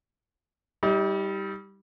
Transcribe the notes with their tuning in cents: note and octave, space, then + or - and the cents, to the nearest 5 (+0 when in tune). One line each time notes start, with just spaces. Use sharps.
G3 +0 D#4 +45